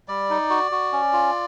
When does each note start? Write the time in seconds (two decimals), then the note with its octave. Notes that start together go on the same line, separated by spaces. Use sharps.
0.08 G3 D5
0.30 D#4
0.50 F#4
0.71 F#4
0.93 C#4
1.13 F4